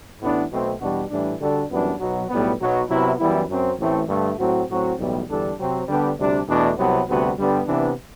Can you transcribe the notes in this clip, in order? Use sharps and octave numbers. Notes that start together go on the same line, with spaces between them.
A1 A2 E3 B3 D4
B1 B2 A3 C4
E2 B2 G3 D4 F#4
A2 E3 G3 D4
D3 G3 D4 F#4 A4
F#2 E3 G3 B3 D4
B1 B2 F#3
B1 A2 G3 B3
B1 B2 F#3
C3 F#3 B3 E4
F#2 E3 G3 B3 E4
F#2 F#3 C4
A1 A2 E3 A3 C4
G2 D3 A3
A2 F#3 C4 F#4
A2 F#3 C4 F#4
B1 A2 E3 G3 B3
E2 D3 G3 D4 A4
C3 F#3 C4
D3 G3 B3 D4 G4
D2 C3 G3 D4
E2 B2 A3 D4
C2 C3 F#3 B3
D2 C3 G3 B3 F#4
G2 D3 G3 B3
C3 E3 B3 D4